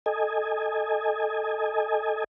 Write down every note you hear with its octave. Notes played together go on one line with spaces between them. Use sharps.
A4 D#5 G#5